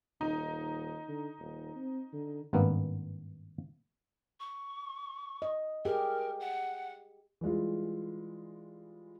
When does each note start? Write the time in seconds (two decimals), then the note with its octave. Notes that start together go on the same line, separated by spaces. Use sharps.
0.21 D#1 D#4
1.08 D3
1.39 D#1
1.76 C4
2.13 D3
2.53 G#1 G2 A#3 B3
4.40 C#6
5.42 D#5
5.85 G4 G#4 A#4
6.40 F#5
7.41 E3 G3 G#3 F4